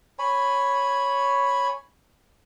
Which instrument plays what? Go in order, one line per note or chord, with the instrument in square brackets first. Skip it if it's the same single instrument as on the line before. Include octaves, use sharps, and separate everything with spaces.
[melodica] C#5 G#5 B5